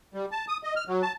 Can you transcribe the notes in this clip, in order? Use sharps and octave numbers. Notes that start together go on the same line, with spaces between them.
G3
A5
D#6
D#5
F6
F#3
A5